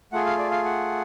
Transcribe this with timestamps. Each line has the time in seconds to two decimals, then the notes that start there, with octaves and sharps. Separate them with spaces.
0.12 A3 F4 G#4 F#5
0.26 F5
0.38 D5
0.51 F5
0.65 F#5